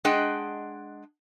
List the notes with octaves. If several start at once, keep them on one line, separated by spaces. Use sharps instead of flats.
G#3 D4 G#4 D#5 F#5 G5